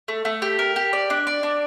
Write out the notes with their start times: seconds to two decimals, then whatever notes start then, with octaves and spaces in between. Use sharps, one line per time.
0.08 A3
0.25 A3
0.42 G4
0.59 A#4
0.76 G4
0.93 D5
1.10 D4
1.27 D5
1.43 D4